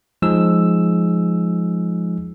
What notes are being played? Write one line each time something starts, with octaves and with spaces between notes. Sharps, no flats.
F3 G#3 D#4 G#4 E6